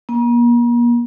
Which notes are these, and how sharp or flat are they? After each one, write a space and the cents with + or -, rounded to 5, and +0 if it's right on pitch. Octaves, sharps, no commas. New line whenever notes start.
A#3 +40